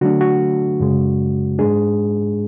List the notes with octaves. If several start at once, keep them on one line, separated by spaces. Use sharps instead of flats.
D3 F#3 A3 D4 F#4
F#4
F#2 C#3 G#3
G#2 G#3 D4 G#4